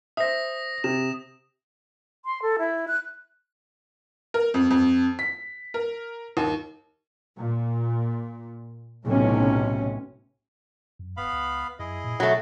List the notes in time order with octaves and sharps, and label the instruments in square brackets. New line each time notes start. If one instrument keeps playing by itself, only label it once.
[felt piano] C5 E5 [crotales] D#6 A#6
[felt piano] C3 [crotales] E7
[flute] C6
A4
E4
F#6
[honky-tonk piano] A#4
F2
F2
B6
A#4
D#2
[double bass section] A#2
B1 A2 C3 C#4
[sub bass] F#2
[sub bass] D1 [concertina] B3 F5 B5
[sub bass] C#2
[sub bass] F#2 [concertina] E4 G#4 D#5
[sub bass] A#2
[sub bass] B2 [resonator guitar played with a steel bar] F#3 A3